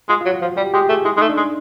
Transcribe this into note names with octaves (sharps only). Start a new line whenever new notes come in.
G#3 F4
F4
F#3
F#4
F3
G3 G4
G#3 G4
A3 G#4
G#3 E4
G#3 D#4
A3
D4
G#3